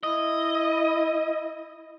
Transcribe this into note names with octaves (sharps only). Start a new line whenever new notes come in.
E4 D#5